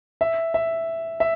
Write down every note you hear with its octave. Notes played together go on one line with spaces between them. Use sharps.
E5
E5
E5